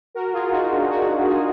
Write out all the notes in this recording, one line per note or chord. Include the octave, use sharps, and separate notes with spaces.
F#4 A#4
F4 G#4
D#4 F#4
D4 F4
F#4 A#4
F4 G#4